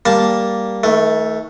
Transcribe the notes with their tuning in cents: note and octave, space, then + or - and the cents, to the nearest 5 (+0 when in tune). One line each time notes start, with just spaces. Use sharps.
G3 +0 A#3 +0 A5 +0
D#3 +45 A3 +0